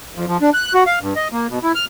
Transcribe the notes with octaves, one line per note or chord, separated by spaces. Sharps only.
F2
F3
D4
F#6
F#4
F5
G2
D#5
A#3
B2
E4
F6